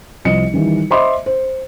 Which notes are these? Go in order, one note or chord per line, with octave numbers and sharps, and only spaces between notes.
C2 F3 D#5 C#7
D#3 E3 G3
C5 D#5 E5 B5 C6 D6
C5